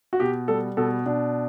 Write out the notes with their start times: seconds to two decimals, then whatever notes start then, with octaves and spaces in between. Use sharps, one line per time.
0.13 F#4
0.20 B2 G4
0.48 G3 A4
0.77 B2 A4
1.06 B2 D4